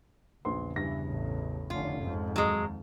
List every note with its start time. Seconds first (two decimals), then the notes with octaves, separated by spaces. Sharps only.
0.45 A#1 E2 C#3 B4 C6
0.76 G2 E3 A#6
1.06 A1
1.70 F1 D3 C#4 F4
2.02 F2 G#2
2.36 D#2 F#3 G#3